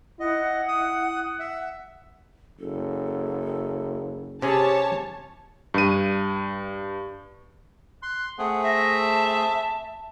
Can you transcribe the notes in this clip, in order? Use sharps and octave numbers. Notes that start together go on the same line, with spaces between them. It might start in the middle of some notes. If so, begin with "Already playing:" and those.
E4 D#5 F#5
D#6
E5
F#1 A4
C3 C#4 G4 G#4 C#5 A5
G2 D#7
C6 F#6
A3 C4 G#4 F#5
E5 A#6
A5